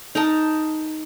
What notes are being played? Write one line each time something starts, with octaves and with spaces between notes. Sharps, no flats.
D#4 A#4 A5